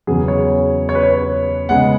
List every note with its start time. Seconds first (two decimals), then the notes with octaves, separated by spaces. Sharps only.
0.07 E2 C#3 F#3 B3 G#4
0.28 C#5
0.89 C#5
0.95 B4
1.03 C#5
1.69 C#3 G#3 B3 F#5